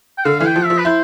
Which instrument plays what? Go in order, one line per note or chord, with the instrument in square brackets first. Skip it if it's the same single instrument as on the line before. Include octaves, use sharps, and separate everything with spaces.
[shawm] G5
[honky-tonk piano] D3 [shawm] F5
[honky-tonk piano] E3 [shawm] F5
[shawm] G5
[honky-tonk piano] F3
[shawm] E5
[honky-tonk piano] F3
[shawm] B4
[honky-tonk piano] E4 [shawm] C5